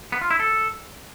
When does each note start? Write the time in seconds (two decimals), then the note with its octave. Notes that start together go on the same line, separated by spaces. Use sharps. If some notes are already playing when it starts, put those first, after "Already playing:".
0.12 B3
0.21 F4
0.31 E4
0.40 A4